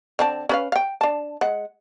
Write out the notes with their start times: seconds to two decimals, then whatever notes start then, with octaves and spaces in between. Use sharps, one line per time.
0.19 D3 C4 A5
0.49 C#4 B4 F5
0.72 F5 G5
1.01 D4 A5
1.41 G#3 F#5